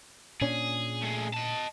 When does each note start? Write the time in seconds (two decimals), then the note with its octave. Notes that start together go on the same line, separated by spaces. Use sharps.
0.41 A#2 C#4 D4 G#4
1.03 A3 G#4
1.34 D#5 A5